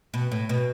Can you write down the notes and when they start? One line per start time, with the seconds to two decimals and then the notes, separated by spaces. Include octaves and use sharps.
0.14 B2
0.32 A2
0.49 B2